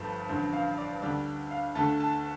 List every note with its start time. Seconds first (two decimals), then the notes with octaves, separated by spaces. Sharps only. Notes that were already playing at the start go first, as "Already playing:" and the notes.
Already playing: G1 G2 F3 A3
0.28 A1 G2 D3 F3 C5
0.53 F5
0.78 D5
1.02 D2 D3 G3 D5
1.51 F5
1.75 D2 D3 A3 A5
2.00 A5